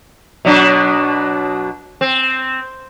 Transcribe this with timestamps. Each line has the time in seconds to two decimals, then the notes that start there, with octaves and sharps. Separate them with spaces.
0.45 B2 F#3 D4
2.01 C4